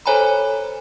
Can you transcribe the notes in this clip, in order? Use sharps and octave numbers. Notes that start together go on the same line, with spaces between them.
A4 C5 C#5 G#5 A#5 B5